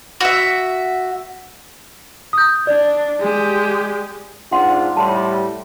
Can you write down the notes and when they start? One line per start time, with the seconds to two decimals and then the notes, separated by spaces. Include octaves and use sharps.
0.21 F#4 E5
2.33 D#6 G6
2.67 D4 D5
3.20 G#3 G4
4.52 G#2 D4 F4 F5 F#5 C6
4.96 A2 G3 A5 C6